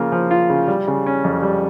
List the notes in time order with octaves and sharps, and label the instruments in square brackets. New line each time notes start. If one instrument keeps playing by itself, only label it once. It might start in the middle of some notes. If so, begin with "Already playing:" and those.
Already playing: [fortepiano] C#3 F3 A#3 F4
F3
F4
C#3
G3
C#3
C#4
F2
G3